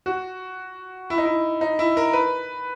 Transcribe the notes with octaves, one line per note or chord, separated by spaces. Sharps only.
F#4
E4
D#4
E4
D#4
E4
A#4
B4